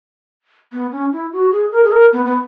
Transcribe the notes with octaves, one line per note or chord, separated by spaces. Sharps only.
B3
C#4
E4
F#4
G#4
A#4
G#4
A#4
B3
B3